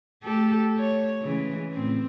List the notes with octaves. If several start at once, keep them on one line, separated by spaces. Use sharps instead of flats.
A3 G4 A4
C#5
C#3 E3 G#3
A2 C4